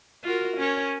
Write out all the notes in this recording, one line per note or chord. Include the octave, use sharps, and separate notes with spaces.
F4 F#4 A#4
C#4 A#4 C#5